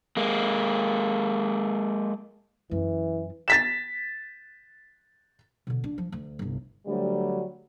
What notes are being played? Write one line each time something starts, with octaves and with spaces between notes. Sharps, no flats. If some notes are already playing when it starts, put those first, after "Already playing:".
G#3 A#3
F#2 E3
A6 B6 E7
B2 D3
D4
F3
D2
G1 C2
D2 F#3 G3